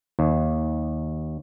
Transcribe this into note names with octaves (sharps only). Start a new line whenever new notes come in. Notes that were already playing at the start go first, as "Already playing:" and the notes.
D#2